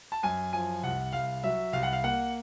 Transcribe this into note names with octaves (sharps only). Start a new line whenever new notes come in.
A5
F#2 G#5
F3 G#5
C2 F#5
C2 F5
F#3 E5
C2 F5
F#5
F5
A#3 F#5